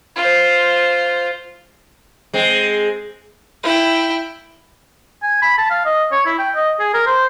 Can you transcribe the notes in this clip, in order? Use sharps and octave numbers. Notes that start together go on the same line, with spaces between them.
F4 C5
G#3 C4
E4 G5
G#5
B5
A5
F5
D#5
C#5
E4
G5
D#5
G#4
A#4
C5